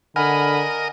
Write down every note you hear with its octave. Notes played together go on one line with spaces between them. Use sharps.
D3 A#4 D#5 F#5 G#5 B5 F6